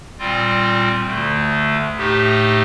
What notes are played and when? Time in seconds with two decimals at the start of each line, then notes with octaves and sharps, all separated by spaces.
0.18 A#2 G3 C4 F4
1.06 D2 D3 A3
1.94 A2 A3 D#4 G4